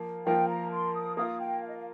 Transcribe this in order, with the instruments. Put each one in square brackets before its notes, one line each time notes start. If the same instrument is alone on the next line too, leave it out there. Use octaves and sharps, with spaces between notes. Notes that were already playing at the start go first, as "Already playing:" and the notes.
Already playing: [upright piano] F3 A#3
[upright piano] F3 A#3 F4 A#4 [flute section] G5
[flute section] A#5
C6
D#6
[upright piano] A#3 F4 A#4 [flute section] D#6
[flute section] G5
F5
D#5
F5